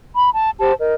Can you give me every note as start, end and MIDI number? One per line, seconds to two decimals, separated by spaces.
0.16 0.29 83
0.34 0.50 81
0.60 0.72 67
0.60 0.72 72
0.60 0.72 81
0.78 0.94 70
0.78 0.94 75